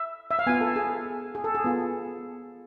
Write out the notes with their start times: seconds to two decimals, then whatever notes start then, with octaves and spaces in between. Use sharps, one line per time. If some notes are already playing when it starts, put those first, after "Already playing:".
Already playing: E5
0.31 E5
0.39 F5
0.47 B3 F4 G#5
0.61 A4
0.76 G#4
1.35 G#4
1.44 A4
1.55 G#4
1.64 B3 F4